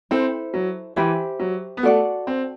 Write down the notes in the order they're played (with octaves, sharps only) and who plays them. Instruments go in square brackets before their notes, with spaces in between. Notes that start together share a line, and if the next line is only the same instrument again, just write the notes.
[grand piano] C4 [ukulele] E4 A4 C5
[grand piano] F#3
[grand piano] E3 [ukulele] G4 C5 E5 B5
[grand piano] F#3
B3
[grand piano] A3 [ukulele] F#4 A4 D5 F#5
[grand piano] C4